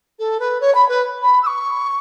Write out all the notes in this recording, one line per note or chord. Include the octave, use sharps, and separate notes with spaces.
A4
B4
C#5
B5
B4
B5
E6
C#6